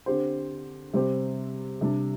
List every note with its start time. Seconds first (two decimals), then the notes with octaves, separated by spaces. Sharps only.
0.06 D3 C4 G4 C5
0.93 C3 G3 C4 G4 C5
1.81 C3 G3 D4